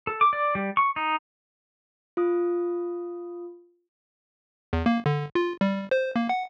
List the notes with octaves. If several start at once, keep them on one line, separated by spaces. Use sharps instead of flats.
A4
D6
D5
G3
C#6
D#4
F4 D#6
E2
A#3
D3
F4
G3
C5
A#3
F#5